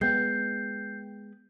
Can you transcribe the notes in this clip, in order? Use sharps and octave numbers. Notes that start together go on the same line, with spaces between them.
G#3 B3 G5 G6 C7